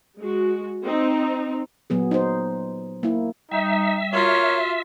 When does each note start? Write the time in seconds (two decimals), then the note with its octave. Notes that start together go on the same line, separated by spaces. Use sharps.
0.20 G#3 F#4
0.84 C4 D#4
1.90 A#2 F#3 B3 G#4
2.11 D#4 C5
3.03 A#3 E4
3.51 G3 D#4 E5
4.13 F4 F#4 A#4 C#5